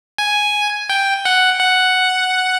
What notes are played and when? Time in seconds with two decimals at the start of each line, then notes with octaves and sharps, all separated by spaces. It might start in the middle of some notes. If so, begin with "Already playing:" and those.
0.18 G#5
0.89 G5
1.25 F#5
1.60 F#5